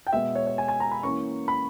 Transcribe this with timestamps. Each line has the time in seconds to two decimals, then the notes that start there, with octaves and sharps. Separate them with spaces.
0.07 G5
0.13 B2 G#3 B3 E5
0.35 C#5
0.47 C#5
0.58 G#5
0.68 G#5
0.80 A#5
0.92 B5
1.03 E3 A#3 C#4 C#6
1.48 B5